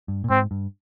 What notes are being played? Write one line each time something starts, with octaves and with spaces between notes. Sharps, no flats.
G2
A#2
G#2 C4
G2